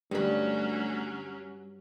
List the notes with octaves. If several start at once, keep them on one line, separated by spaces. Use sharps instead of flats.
D2 G2 F#3 G3 C#4 B5